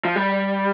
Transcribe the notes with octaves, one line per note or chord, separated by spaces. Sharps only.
F3
G3